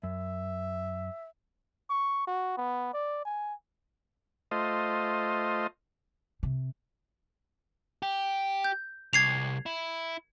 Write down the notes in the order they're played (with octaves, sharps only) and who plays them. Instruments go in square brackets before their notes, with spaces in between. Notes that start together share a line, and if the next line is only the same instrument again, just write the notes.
[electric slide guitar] F#2 [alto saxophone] E5
[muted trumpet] C#6
F#4
B3
D5
G#5
[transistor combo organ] A3 F4 C5 D#5
[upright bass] C3
[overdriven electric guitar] G4
[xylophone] G6
[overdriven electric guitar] C2 [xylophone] G#6 C7 F7
[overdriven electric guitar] E4